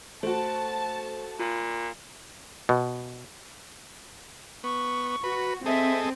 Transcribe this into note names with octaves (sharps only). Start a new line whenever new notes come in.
A3 F#4 C5 A5
A#2 F4
B2
B3 C#6
F#4 B4
C4 G#4 A4 D#5 E5